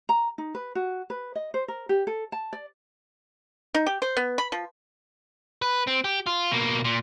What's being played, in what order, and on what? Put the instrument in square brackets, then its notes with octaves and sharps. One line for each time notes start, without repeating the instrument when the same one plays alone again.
[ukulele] A#5
D#4
B4
F#4
B4
D#5
C5
A#4
G4
A4
A5
D5
[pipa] D#4
G4
C5
B3
B5
F3
[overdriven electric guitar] B4
C4
G4
F4
B2 A#3
A#2